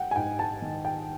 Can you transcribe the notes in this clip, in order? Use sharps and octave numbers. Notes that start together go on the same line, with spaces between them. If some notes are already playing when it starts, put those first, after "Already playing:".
Already playing: F#5 G5
G#5
G#2 G5
A5
D#3
G5